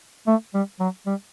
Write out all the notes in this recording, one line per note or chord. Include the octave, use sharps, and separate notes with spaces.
A3
G3
F#3
G3